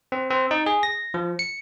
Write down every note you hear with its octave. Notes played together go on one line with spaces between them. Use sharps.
C4
C4
D#4
G#4
A#6
F3
C#7